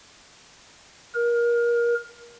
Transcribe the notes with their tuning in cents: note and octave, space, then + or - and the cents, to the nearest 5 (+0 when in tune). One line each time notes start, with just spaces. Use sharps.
A#4 +25